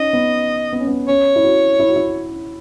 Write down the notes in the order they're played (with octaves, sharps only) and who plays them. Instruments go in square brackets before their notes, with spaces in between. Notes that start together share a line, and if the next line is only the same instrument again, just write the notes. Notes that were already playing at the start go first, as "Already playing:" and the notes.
Already playing: [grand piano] C#4 D#4 [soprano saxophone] D#5
[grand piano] B3
B3
C#4
B3
[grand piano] C#4 [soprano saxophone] C#5
[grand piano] E4
F#4
E4
F#4
E4